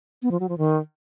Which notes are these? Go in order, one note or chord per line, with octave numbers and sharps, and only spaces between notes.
B3
F3
F#3
F3
D#3